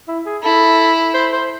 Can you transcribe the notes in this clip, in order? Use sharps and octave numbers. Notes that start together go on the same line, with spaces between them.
E4
G#4
E4 A4
C5
C5